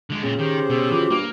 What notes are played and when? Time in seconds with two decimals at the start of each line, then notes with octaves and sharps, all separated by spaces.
0.10 D3 G#3
0.23 A#2 C#3 C4
0.39 D#3 G4 C5
0.70 B2 G#4 C#5 E6
0.91 E3 F4 F#4 D6
1.10 G2 A#3